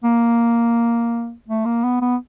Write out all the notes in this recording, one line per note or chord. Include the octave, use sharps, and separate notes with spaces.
A#3
A3
A#3
B3
B3